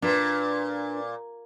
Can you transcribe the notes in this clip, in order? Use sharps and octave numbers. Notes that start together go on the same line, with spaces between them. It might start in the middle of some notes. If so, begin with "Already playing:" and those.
A#2 D4 B4